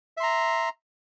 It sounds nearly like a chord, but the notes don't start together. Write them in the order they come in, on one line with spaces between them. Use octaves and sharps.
E5 C6 A#5